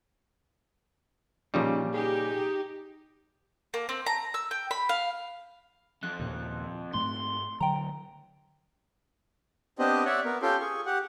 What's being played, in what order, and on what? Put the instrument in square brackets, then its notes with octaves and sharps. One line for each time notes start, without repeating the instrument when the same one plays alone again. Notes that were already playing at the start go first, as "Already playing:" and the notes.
[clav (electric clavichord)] A#2 C#3 G3 [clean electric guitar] F3 C#4 D#4
[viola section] D#4 G4 [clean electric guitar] G#4
[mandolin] A#3
C4
A#5
E6
G5
B5
F5
[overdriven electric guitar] F2 [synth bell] F#6
[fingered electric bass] D#2 A#2 C#3
[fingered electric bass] G#2 A3 C4 [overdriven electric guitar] C6
[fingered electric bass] D3 F#3 [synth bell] G5 A#5
[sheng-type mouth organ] B3 C4 D4 G4 C5 D#5
C#5 D5 E5 F#5
B3 A#4
C#4 F4 G4 A4 G5 C6
G#4 C#6
G4 F#5